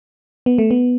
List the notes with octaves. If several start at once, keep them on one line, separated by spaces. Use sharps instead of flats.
B3
A3
B3